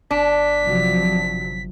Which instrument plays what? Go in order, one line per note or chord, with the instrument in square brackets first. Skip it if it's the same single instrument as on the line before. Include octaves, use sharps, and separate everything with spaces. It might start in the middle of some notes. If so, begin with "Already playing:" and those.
[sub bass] G1 [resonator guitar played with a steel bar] D4 [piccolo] B6
[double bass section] C3 F3 F#3